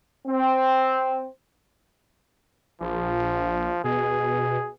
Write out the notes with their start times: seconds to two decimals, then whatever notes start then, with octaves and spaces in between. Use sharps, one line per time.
0.27 C4
2.81 A#1 F3
3.84 B2 G#4